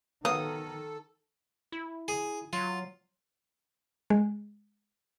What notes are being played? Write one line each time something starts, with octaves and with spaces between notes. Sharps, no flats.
D#3 F#3 B3 A4 F5 D#6
E4
G#4
F#3 F4
G#3